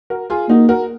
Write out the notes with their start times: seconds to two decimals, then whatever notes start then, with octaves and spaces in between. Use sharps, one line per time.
0.10 F#4 A#4
0.30 F4 G#4
0.49 A#3 D#4 F#4
0.69 F#4 A#4